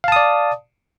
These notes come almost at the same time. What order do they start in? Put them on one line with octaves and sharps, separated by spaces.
F5 A5 D#6 D5